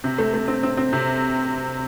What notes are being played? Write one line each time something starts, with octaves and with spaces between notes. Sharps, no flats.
C3
A3
A3
C4
C4
C4
C3